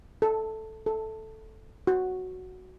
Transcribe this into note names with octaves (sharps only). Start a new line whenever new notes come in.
A4
A4
F#4